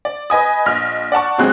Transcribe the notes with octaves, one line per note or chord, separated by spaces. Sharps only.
D5
B4 D#5 G#5 D#6
A#1 D#5 F6
D5 F#5 A5 C#6
G#1 C3 F#3 G#3 C4 F#6